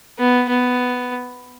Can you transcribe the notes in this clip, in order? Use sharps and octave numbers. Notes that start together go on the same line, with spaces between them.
B3
B3